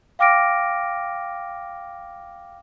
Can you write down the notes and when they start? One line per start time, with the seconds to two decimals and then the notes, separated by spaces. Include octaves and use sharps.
0.19 F5 G5 D6 F6 A#6 D7